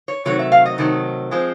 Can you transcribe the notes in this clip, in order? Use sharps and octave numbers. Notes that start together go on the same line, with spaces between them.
C#5
C3 D#3 F#3 A3 C#5
E5
F5
D#5
C3 D#3 F#3 A3
F3 G#3 C4